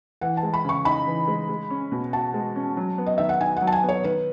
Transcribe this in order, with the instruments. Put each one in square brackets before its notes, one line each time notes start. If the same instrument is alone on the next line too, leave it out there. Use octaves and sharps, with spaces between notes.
[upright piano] E3 [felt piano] F#5
[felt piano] A5
[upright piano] G#3
[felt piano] B5
[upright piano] C#3 [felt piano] C#6
[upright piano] D#4 [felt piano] B5
[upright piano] E3
G#3
G#3
C#4
B2
[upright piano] F#4 [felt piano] A5
[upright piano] G#3
C#4
F#3
B3
[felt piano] D#5
[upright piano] D#3 [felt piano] E5
[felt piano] F#5
[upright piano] D#4 [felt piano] G#5
[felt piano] F#5
[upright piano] F#3
[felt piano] A5
G#5
[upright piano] B3
[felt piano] C#5
[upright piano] D#3 [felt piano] B4